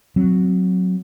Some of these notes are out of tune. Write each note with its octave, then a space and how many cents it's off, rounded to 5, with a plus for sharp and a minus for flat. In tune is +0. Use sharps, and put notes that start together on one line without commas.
F#3 -5 C4 +0